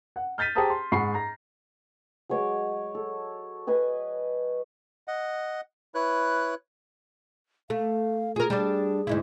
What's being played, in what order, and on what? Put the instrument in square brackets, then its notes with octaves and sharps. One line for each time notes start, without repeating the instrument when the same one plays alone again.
[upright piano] F#5
F6 G6 A6 B6 D#7
G4 G#4 C5 A5 A#5 D#6
C6
G#2 F#5 B5 C#6 C7
A#5 A#6
[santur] F#3 G#3 C#5 D6
A4
B4 D#5 G#5 D#6
[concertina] D#5 F#5
E4 B4 C#5 F#6
[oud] A3 [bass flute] F5
[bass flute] F4 [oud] G#4 A#4
[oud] G3 D4 [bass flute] G#4
[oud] D2 G#2 E4